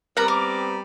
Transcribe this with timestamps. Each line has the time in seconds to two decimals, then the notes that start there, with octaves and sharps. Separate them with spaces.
0.17 G3 B3 C4 A#4 F#5 A#5 B5
0.28 A#4 D6